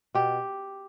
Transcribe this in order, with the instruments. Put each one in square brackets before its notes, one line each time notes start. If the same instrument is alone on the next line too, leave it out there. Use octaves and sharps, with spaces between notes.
[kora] B2 G4